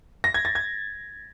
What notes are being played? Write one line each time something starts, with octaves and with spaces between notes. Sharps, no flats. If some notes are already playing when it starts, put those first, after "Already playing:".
A#6
G#6
A6
G#6